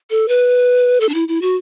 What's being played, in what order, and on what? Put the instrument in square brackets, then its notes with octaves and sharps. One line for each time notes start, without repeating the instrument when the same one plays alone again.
[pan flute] A4
B4
A4
D4
E4
E4
F#4